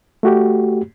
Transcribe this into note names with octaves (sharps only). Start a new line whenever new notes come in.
A3 F#4 G4